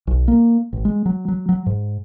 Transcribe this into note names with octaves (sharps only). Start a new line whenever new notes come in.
B1
A#3
A1
G#3
F#3
F#3
F#3
G#2